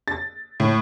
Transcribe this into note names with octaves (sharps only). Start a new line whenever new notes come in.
A6
A2